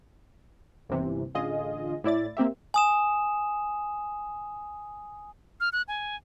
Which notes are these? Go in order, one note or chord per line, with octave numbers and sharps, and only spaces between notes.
G1 D#2 C3 E3
A1 D3 F4 G#4 D#5
A2 E4 D5 A6
A#3 C4 G4 E5
G#5 D#6 E7
F6
F#6
G#5